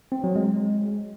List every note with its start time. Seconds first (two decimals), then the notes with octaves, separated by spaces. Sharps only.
0.12 C4
0.24 F#3
0.36 G#3